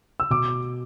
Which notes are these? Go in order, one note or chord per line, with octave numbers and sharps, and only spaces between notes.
E6
B2 D6